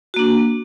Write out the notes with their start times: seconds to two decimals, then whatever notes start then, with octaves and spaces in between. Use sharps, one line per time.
0.14 F#4
0.16 A#3
0.19 D4